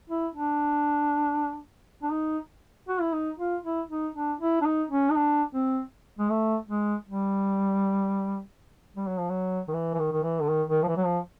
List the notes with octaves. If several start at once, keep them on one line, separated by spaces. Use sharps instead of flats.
E4
D4
D4
D#4
F#4
E4
D#4
F4
E4
D#4
D4
E4
D4
D#4
C#4
D#4
D4
C4
G#3
A3
G#3
G3
G3
F#3
F3
F#3
D#3
E3
E3
D#3
D#3
E3
D3
D#3
D#3
F3
E3
F#3
F3